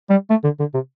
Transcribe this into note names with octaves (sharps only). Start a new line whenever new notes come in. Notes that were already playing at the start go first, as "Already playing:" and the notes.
G3
A3
D3
D3
C3